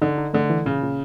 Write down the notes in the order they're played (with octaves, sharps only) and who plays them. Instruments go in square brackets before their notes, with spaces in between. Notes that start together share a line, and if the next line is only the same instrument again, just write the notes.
[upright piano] D3 [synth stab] D#4
[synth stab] D#4
[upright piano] D3 [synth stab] A3
[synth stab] E3
[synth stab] A#2 [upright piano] C#3
[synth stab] A#2